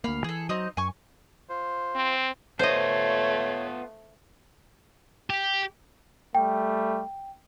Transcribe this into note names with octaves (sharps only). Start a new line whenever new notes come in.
D2 A#3 F5 B5
E3 G#4 A4
F#3 C4 D#4 D#5
F#2 G#5 C#6
F4 C5
C4
A3 B3 F4 C5 C#5 D#5
G4
G3 A3 G5